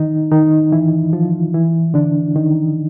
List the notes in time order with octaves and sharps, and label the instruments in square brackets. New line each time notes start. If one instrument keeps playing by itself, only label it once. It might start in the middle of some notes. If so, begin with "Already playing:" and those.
Already playing: [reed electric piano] D#3 D#4
D#3 D#4
E3 E4
F3 F4
E3 E4
D3 D4
D#3 D#4